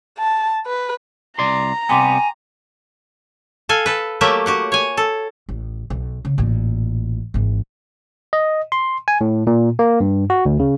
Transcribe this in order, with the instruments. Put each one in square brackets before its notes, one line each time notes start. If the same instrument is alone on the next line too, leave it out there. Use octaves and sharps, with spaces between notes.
[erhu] A5
B4
[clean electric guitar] C2 D5 C6 [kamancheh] A#5
[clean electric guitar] C3 G3 B3 [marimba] G5 C6 D6 [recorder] G#5
[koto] A4 F5 G#5
A4 B4
F#3 A3 A#3 G4 E5
F#4 G4 F#5
C#5 G#5
A4
[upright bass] A1
B1
C#3
A1 A#2
G#1 E3
[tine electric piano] D#5
C6
G#5
A2
A#2
A#3
G2
F#4
D2
C#3